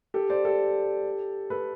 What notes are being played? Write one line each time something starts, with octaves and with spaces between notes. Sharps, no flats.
G4 A4
C5 D5
G4 A4
A4 B4